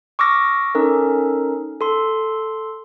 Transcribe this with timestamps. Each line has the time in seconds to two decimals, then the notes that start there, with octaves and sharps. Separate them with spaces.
0.19 C#6 D6 E6 F6 A#6
0.75 C#4 D#4 A4 A#4
1.81 A4 C6